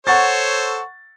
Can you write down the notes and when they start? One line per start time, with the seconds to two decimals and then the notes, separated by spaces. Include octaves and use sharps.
0.07 A4 C5 C#5 F#5 C#6 A6